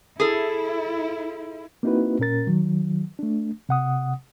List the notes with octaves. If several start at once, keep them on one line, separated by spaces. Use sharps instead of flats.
E4 G#4 A4
A#3 C4 D#4 E4 F#4 B4
A#2 C#4 A#4 A6
D#3 F#3
A3 D4
C3 F#5 D#6